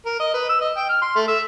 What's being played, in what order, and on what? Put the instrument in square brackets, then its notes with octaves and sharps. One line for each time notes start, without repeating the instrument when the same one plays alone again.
[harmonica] A#4
D#5
B4
E6
D#5
G5
F6
C6
A3
E5